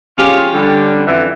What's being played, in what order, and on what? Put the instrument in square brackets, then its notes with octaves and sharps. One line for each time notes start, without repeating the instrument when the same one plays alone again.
[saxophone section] F3 G#3 F4 [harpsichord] C#4 G4
[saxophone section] D3 G3
F2 D3 E3